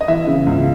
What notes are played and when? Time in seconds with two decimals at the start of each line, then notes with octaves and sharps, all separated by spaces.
0.01 D#5
0.08 E3 E5
0.27 C#3
0.47 C#2